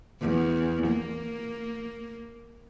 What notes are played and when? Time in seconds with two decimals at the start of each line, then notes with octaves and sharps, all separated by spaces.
0.22 E2
0.87 A#3